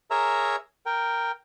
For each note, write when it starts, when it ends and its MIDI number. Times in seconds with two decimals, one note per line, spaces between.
0.11 0.56 68
0.11 0.56 70
0.11 0.56 73
0.11 0.56 76
0.11 0.56 82
0.11 0.56 88
0.86 1.31 70
0.86 1.31 79